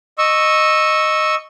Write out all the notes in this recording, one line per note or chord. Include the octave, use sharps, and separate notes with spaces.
D#5 C#6 E6